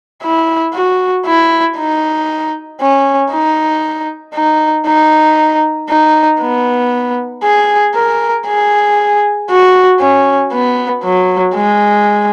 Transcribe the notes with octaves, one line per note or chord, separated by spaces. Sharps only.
E4
F#4
E4
D#4
C#4
D#4
D#4
D#4
D#4
B3
G#4
A#4
G#4
F#4
C#4
B3
F#3
G#3